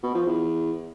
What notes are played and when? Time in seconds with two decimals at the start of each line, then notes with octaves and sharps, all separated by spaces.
0.03 B2
0.15 F3
0.27 E2